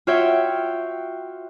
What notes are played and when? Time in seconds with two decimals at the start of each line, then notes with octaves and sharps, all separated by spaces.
0.07 F4 F#4 C#5 E5 G5